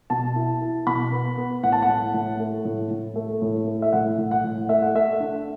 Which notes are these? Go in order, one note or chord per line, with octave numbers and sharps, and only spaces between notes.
B2 A5
E4
E4
B2 B5
B3
B3
A2 F#5
A5
F#5
A2
A2
A3
A2
A2
A3
A2
A3
E5
A2 F#5
A2
F#5
A2
A3 E5
F#5
A3 E5
D4